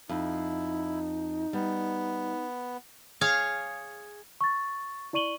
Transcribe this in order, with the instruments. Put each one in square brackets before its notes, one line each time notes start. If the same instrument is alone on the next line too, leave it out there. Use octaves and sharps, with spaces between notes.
[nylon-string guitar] F2 [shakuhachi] D#4 [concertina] E4
[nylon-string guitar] G3 [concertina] B3
[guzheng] G#4 C#5 F5
[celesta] C#6 A6
E4 D5 C#6 D#7 F#7 G7